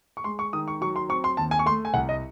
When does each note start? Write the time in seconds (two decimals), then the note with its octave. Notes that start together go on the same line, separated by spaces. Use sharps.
0.17 C#6
0.24 G#3 C6
0.39 C#6
0.53 D#3 D#6
0.68 C#6
0.81 F#3 C#6
0.96 C6
1.09 C4 C#6
1.24 C6
1.37 D#2 A5
1.51 G#5
1.59 C#6
1.66 A3 C6
1.85 G#5
1.94 C2 F#5
2.09 D#5